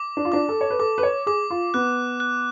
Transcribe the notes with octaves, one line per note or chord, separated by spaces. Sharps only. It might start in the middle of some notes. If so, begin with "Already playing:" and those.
Already playing: D6
D4
F4
D4 D6
A4
C#5
B4
A4 D6
B4
C#5
G#4 D6
F4
B3 F#6
F#6